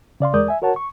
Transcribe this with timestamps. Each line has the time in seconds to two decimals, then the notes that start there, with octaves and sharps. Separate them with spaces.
0.20 C#3 D5 F5 C6
0.34 E2 G#3 A#4 D5 D#6 G6
0.48 E5 G#5
0.62 F#4 A#4 C#5 F#5 A5
0.76 C#6